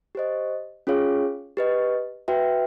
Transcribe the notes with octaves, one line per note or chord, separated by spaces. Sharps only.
G4 C5 D#5
C#4 F4 G#4 C#5 F5
G4 B4 D#5
F#4 B4 E5 G5